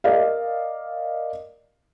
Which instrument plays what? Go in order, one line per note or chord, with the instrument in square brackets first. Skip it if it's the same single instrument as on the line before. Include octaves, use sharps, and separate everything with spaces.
[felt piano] A#4 D5 D#5 F5